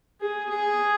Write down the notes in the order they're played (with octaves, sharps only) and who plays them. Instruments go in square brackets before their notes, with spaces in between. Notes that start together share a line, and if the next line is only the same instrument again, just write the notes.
[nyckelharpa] G#4
G#4